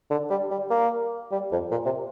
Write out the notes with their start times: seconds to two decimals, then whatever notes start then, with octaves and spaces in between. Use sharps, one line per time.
0.10 D3
0.30 G3
0.51 G3
0.70 A#3
1.32 G3
1.52 F2
1.72 A#2
1.85 C3